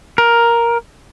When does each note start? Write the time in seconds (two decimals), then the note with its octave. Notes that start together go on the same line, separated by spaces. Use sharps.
0.18 A#4